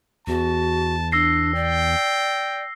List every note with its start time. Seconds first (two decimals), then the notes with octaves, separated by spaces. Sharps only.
0.27 E2 F#4 A5
1.12 D4 E6 A#6 C7
1.55 D5 G5